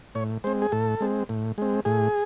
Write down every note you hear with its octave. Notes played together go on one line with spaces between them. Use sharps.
A2 C#5
G#3 C4 C5
G#4
A2 A4
G#3 C4
A2
G#3 C4
A2 G#4